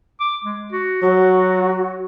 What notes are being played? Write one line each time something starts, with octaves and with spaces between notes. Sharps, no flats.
D6
G#3
F#4
F#3 F#4